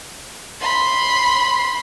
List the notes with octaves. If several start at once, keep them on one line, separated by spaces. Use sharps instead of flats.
B5 C6